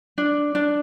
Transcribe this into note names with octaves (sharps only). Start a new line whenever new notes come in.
D4
D4